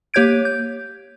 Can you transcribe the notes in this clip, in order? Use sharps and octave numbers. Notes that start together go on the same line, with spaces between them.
A#3 G4 C#5 G6 G#6 D7
G6